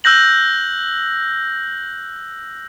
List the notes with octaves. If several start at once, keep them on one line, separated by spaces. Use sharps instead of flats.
E6 F#6 G6 A#6 F#7